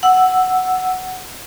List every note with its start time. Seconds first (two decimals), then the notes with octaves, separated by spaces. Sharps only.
0.03 F#5 E6